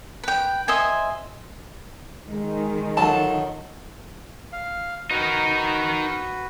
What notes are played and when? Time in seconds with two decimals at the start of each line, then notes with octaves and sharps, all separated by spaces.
0.23 B4 G5
0.68 C5 D#5 E5 G#5
2.27 D#3 G#3
2.97 F#3 F4 A4 A5
4.52 F5
5.11 D#4 F#4 A#4 B4